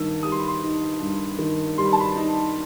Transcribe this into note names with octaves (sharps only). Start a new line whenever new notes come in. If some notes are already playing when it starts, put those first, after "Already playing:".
Already playing: G2 D#3 E6
G3 D#6
C6
B5
C6
D#4
G2
D#3
G3 C6
B5
A5
B5
D#4